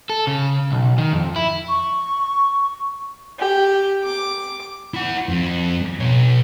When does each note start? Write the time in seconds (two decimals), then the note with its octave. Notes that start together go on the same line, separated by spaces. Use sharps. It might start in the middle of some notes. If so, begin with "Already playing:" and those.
0.10 A4
0.27 C#3
0.72 B1
0.98 D#3
1.13 F2
1.36 E4
1.69 C#6
3.39 G4
4.04 D6
4.94 E4 F#5
5.29 F2
6.00 B2 C#5